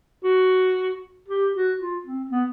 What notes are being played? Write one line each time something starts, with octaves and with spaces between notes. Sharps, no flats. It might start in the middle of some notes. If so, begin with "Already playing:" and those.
F#4
G4
F#4
F4
C4
B3